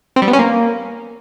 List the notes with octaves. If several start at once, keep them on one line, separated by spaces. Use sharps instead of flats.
C4
G3
B3
C#4
A#3